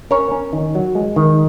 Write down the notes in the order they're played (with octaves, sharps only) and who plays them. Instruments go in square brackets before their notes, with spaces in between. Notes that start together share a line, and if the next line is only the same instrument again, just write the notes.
[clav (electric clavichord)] C#4 A#4 C#5
C#4
D#3
F#3
G#3
D#3